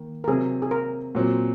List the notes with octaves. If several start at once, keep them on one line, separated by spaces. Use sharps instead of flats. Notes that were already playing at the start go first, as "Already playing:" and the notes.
Already playing: D#3 A#3
A#4
C3 F#3 C4 G#4
G#4
A#4
A#2 F#3 C4